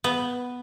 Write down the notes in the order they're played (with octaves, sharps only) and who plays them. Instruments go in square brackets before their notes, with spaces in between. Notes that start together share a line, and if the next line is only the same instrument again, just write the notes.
[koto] B3